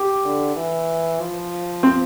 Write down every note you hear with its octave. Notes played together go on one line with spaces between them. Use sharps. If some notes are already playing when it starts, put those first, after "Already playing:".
Already playing: G4
D3
E3
F3
C4